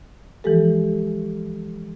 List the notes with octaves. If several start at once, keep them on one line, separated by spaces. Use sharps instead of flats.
E3 F3 G#3 G4 A4